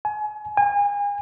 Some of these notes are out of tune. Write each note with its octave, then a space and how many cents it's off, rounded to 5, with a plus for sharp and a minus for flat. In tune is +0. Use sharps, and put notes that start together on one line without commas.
G#5 +30
G#5 -35